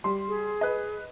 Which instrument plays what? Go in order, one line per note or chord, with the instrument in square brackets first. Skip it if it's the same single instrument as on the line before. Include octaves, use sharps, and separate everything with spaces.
[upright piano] G3 C6
[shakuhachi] G#4
[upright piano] B4 D#5